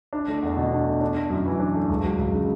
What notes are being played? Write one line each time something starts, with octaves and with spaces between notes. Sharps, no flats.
D4
A3
E2
B2
D4
A3
D4
A3
F#2
E3
D4
A3
C#2
F#3
C#2
C#3